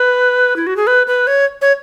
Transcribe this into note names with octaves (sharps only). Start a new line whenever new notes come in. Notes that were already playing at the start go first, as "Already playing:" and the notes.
Already playing: B4
E4
F#4
G#4
B4
B4
C#5
C#5